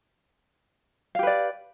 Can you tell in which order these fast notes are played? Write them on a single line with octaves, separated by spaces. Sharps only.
F5 G4 B4 D5